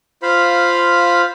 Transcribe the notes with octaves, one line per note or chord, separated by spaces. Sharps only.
F4 C5 F5 B5